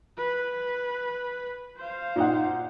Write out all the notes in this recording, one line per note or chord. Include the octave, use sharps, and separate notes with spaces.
B4
C5 F5
A#2 D#4 F#5